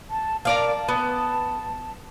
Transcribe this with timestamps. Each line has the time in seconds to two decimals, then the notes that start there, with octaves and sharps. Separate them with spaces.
0.10 A5
0.45 A#4 D5 F5 A5
0.89 B3